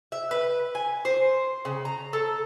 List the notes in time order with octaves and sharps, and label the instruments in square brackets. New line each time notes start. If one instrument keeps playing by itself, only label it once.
[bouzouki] E5
B4
G#5
C5
C#3
A#5
A4